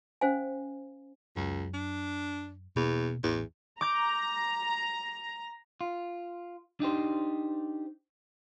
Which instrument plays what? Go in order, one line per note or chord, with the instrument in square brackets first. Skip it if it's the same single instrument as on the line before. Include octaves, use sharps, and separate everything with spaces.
[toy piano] C#4 C5 F5 G#5
[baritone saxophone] C#2 [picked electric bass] F#2
[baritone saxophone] D4
[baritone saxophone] E2 [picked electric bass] B2 A#3
[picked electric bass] A1 [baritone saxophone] E2
[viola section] A#5 [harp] D6 G6
[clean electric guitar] F4
D4 D#4 G4 C5